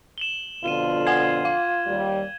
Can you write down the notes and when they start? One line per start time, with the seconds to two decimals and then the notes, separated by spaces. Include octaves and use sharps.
0.18 E7 F#7 G7
0.64 F2 B2 D3 F4 D#7 E7 G7
1.07 F#5 G#5 G#6 C7 G7
1.45 F5
1.87 D#2 G3